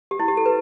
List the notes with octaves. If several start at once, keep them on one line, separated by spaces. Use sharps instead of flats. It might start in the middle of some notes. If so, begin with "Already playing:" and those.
G4
E4
G4
A4
B4